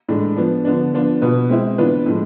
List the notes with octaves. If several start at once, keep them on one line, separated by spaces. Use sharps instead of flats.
A2 E3 G#3 D4
F3 B3 D4
D3 F3 B3 D4
F3 B3 D4 F4
B2 B3 F4 B4
G#3 C4 E4
E3 B3 D4 F4 B4
A2 F3 G#3